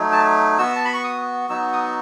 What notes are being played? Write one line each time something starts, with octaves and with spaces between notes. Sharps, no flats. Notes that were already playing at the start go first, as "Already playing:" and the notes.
Already playing: F#3 A3 D#4
A5
B3 F#4 E6
A5
B5
C#6
D#6
F#3 B3 D#4 F#4 E6
D#6